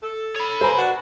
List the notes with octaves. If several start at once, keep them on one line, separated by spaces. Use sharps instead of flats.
A4
C#5 B5
A#3 B4 C5 G#5 A#5
D4 F#4